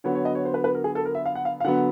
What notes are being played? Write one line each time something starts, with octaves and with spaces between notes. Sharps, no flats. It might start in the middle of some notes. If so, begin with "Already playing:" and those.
D3 F#3 B3 C#5
C#5
D#5
C#5
C5
B4
B4
A#4
G#4
A4
A#4
E5
F5
F#5
F5
F5
D3 F#3 B3 F#5